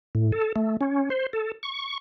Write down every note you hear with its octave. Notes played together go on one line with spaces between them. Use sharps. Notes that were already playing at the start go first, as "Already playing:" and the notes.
A2
A4
A3
C#4
C5
A4
C#6